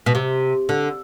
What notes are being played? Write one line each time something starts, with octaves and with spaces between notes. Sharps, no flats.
B2
C3
D3